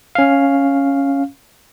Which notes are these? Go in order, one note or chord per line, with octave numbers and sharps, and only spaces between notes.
C#4 F5